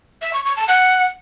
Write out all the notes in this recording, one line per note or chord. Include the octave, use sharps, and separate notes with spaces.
E5
C#6
C#6
A5
F#5